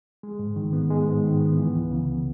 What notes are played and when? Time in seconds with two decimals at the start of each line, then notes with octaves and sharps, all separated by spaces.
0.23 G#3
0.39 G#2
0.56 D#3
0.73 B3
0.90 G#3
1.07 G#2
1.24 D#3
1.41 B3
1.58 E3
1.75 C#2
1.91 C#3